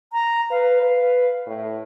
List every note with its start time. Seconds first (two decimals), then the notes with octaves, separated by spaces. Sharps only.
0.13 A#5
0.51 B4 F5
0.83 B4
1.47 A2